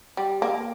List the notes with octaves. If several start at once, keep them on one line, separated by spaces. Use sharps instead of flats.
G3
A#3